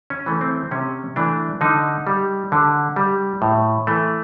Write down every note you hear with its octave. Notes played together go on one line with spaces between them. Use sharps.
C#4
E3 A3
C4
C3 C#4
E3 A3 D4
D3 D#4
G3
D3
G3
A2
E3 A3